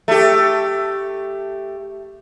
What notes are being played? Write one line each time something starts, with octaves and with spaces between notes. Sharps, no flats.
A3 G4